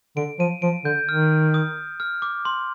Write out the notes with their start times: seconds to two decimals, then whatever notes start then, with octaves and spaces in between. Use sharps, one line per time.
0.17 D3 D7
0.39 F3 D#7
0.62 F3 D7
0.85 D3 G6
1.08 D#3 F6
1.54 D#6
2.00 F6
2.22 D6
2.45 C6